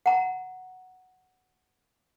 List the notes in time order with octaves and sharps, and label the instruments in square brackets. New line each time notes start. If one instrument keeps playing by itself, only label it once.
[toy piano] F#5 A#5